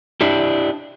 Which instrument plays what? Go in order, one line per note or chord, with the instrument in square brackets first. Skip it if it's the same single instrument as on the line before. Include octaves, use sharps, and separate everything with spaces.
[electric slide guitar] D4 E4 G4